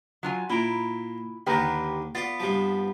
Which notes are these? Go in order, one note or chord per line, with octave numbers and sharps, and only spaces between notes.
F#3 F4 G#5
A#2 E4 F4 A#5 B5 D7
D#2 D3 D#3 G4 B4 G5 A#5 A#6
B3 F4 D5 A6
G2 C3 F3